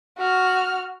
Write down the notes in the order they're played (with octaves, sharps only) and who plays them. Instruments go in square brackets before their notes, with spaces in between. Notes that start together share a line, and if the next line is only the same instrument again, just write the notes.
[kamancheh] F#4 F6